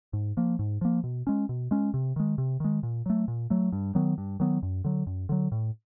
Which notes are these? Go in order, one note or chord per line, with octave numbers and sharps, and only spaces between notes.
G#2
F3 A#3
G#2
F3 A#3
B2
G#3 C#4
B2
G#3 C#4
C3
D#3 G#3
C3
D#3 G#3
A#2
F#3 A3
A#2
F#3 A3
G2
D#3 F#3 B3
G2
D#3 F#3 B3
F#2
D3 F#3
F#2
D3 F#3
A2